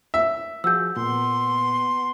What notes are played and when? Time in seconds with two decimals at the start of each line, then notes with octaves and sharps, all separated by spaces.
0.14 E5
0.64 F3 F#4 G#4 E6 G6
0.97 A#2 B3 C6